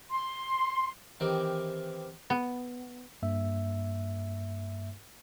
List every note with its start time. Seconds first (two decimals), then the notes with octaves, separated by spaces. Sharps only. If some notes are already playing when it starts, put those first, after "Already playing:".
0.12 C6
1.20 D#3 E3 C4 D#4 G4 A#4
2.30 B3
3.22 G2 A#3 E5